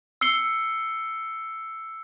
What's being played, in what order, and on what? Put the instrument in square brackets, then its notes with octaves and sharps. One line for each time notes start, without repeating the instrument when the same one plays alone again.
[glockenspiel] E6 C7 C#7 G7